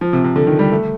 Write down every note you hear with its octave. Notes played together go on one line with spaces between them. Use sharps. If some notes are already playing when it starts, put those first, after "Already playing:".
F3
C3
C3
D3
D#3
G3
A3